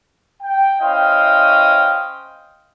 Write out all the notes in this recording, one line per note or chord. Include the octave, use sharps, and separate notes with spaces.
G5
C#4 E4 C5 D#5 F5 G5